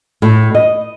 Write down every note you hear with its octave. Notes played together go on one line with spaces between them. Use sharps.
A2
D#5